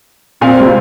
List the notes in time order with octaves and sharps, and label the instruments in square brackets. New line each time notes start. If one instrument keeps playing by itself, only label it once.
[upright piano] A#2 F5 G#5 [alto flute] C4
[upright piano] C#2 C3